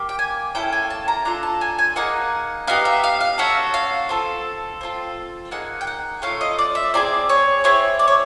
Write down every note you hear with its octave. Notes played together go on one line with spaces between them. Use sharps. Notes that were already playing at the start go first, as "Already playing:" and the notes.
Already playing: A#3 G4
G5
G#5
A#3 C#4 E4 A4 G5
G#5
A5
A#5
D4 F4 A4 A#5
A5
G#5
G#5
A#3 D#4 G#4 F#5
B3 D#4 G4 F5
E5
F5
F5
C#4 F#4 A4 E5
F5
C4 F4 A4
C4 F4 A4
A#3 D#4 G#4 F#5
G5
F#5
A3 C#4 F4 F5
D#5
D5
E5
C4 D#4 G#4 D5
C#5
C4 E4 G#4 C#5
D5
C#5